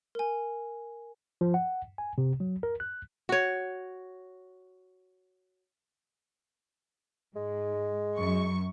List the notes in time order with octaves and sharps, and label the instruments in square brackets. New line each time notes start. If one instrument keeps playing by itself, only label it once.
[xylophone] A#4 G#5
[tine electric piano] F3
F#5
G#5
C3
F#3
A#4
F#6
[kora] F#4 C#5
[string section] G#2 [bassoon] G#3
[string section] F#2 C#6